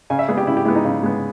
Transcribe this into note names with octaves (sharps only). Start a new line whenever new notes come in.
C#3 G#5
E5
G#3 B3 G#4
G4
C#3 E4
G4
G#3 B3 E4
D#4
C#3
G#3 B3